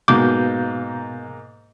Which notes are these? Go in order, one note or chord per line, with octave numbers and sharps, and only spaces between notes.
G#2 B2 A#3 F5 D6 G6